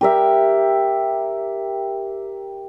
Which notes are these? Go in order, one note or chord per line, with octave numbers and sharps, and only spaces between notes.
G4 A#4 E5